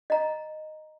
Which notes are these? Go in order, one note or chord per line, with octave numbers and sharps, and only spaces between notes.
D#5 A#5